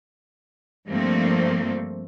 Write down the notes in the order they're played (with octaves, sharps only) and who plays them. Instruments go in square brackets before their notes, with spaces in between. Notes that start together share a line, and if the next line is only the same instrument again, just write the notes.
[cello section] G2 F3 A3 A#3 C4